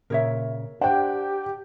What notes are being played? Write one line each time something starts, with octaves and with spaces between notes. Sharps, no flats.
A#2 C#3 A#4 C#5 E5
D4 G4 C5 D5 F#5 G5